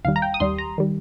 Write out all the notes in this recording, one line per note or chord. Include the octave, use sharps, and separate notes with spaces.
D#2 D#3 G3 F5
A#5
G5
D#6
D#2 D#3 G3 C6
A#5
D#3 G3